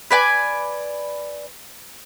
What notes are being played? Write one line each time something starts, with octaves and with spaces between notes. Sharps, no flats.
B4 D5 G#5